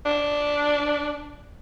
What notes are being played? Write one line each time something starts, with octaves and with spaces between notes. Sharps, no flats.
D4